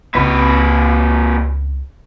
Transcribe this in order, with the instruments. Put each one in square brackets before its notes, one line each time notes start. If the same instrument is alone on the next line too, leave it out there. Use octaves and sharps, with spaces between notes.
[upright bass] C#2 C4 [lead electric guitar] A#2 B4